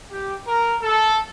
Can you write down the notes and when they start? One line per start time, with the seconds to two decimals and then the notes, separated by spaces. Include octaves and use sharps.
0.11 G4
0.47 A#4
0.82 A4